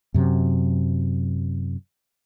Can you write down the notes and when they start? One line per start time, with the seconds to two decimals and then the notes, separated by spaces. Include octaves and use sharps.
0.14 F#2 C3 F#3